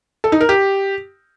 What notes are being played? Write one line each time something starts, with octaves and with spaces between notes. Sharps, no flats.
A4
D#4
A#4
G4